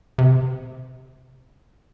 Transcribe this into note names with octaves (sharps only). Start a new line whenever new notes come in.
C3